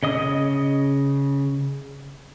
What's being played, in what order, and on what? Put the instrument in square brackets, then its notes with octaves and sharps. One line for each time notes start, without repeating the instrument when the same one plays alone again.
[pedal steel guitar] C#3 D#5 D#6